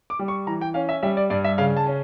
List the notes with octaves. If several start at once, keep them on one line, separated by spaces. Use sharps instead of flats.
D6
G3
C#6
E3 A#5
G5
C#4 F5
E5
G3 E5
D5
G2 D5
E5
C#3 F5
A5
C#4